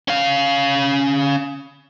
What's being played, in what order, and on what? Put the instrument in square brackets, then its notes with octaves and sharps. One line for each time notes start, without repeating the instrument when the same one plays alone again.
[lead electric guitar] C#4 F5